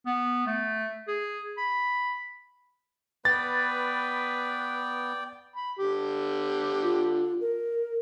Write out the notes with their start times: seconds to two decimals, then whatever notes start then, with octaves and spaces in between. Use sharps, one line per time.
0.06 B3
0.46 A3
1.07 G#4
1.58 B5
3.25 B3 B4 D5 G5 A6
5.56 B5
5.79 D3 G4
6.83 F4
7.41 A#4